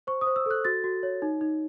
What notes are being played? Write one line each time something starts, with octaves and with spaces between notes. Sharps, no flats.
C5 C#6
D#6
C5
E6
A4 F#6
F#4 A6
F#4
C#5
D#4
D#4